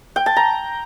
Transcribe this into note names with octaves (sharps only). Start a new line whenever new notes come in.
G5
A5
A#5